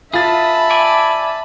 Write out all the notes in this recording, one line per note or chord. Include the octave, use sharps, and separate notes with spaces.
F4 G#4 B4 E5 A5 B5 A6
D5 G#5